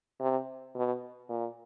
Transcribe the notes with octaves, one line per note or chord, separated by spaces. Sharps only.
C3
B2
A#2